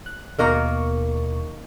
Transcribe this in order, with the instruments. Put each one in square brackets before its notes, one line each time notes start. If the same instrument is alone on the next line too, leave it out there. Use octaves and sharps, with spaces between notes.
[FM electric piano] F#6
[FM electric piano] D#2 B2 C#6 [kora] D#3 A#3 A#4